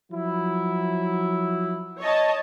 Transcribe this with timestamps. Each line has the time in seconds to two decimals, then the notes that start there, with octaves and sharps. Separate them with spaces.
0.12 F3 F#3 E4
2.00 C#5 D#5 A5